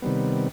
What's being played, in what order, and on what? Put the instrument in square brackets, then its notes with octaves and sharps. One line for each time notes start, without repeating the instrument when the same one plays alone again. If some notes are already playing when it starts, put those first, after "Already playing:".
[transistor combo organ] C3 D#3 G3 B3